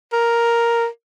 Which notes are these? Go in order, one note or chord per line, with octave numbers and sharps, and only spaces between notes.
A#4